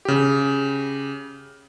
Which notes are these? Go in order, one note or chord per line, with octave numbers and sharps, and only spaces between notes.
C#3 G4